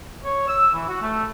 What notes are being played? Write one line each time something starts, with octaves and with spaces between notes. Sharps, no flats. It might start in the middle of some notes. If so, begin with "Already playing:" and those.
C#5
E6
E3
F#4
A3